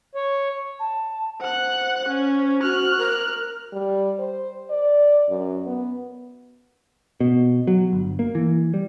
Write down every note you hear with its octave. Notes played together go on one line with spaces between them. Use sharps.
C#5
A5
C5 F#5 F#6
C#4
F#4 F6 F#6
A#4
G3
C5
D5
F#2
B3
B2
F#3
G1
A#3
E3
G3